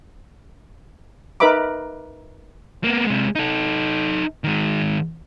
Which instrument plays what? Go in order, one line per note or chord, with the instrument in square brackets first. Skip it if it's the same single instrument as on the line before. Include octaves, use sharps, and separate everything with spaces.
[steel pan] D#4 A#4 B4 E5 B5 D6
[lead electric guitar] A#3 B3
C3 G#3
D#4 A4
D#3 G#3